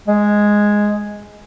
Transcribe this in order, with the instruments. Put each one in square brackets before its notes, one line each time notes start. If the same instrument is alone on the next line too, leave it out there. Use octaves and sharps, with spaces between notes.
[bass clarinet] G#3